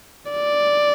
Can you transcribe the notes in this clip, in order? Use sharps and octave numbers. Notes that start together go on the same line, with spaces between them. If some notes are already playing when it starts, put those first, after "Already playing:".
D5